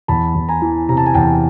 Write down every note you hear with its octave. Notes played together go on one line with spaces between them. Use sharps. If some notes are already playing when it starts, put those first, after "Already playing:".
E2 A5 B5
E2
G#5 A#5
E3
C3 A#5
A5
G#5
E2 G5 A5